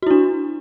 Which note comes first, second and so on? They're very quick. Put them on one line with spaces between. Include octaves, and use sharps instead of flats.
F#4 E4 D4